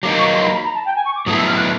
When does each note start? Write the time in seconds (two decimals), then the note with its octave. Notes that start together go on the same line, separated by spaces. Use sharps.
0.03 F#3 A#3 D#4 D6
0.19 C#6
0.34 C6
0.44 B5
0.49 A#5
0.55 B5
0.65 A#5
0.75 A5
0.86 G5
0.96 G#5
1.05 C#6
1.16 D6
1.26 A2 F#3 B3 E4 A4 D#6
1.37 E6
1.47 F6
1.57 F#6